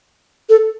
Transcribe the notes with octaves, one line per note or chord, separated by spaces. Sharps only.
A4